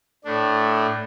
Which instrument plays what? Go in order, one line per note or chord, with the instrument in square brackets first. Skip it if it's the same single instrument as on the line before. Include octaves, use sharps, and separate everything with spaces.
[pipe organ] A2 A3 D4